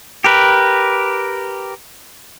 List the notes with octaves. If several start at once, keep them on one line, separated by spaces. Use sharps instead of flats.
G4 A#4 B4